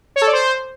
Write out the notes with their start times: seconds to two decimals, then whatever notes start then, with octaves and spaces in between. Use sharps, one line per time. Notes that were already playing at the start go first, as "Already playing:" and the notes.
0.16 C#5
0.22 A4
0.27 D5
0.33 C5